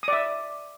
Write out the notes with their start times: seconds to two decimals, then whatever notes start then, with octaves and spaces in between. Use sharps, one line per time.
0.03 D#6
0.08 D5
0.13 E5